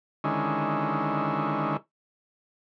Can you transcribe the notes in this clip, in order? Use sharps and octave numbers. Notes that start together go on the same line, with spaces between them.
D3 D#3 G#3 C#4 E4